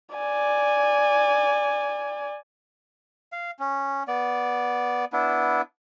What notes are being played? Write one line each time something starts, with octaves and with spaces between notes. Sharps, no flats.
D5 G#5
F5
C#4
B3 D5
B3 D4 E4